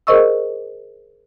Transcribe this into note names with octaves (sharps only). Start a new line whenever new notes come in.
G#4 A#4 C5 D#5 C#6 E6